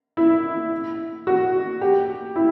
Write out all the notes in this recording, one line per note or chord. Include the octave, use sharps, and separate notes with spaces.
E4
F#4
G4
E4